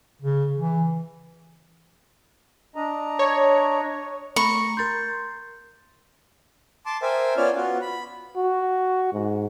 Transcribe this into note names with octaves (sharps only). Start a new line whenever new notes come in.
C#3
E3
D4 D#5 A#5
C#5
A3 A#5 B5 C#6
A#4 C6 G6 A6
A5 C6 D6
A#4 C5 E5 G5 G#5
B3 C#4 F4 C#5 D5 F6
B3 F4 F#4
B5
F#4
G#2